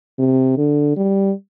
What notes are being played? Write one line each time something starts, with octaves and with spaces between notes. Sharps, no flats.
C3
D3
G3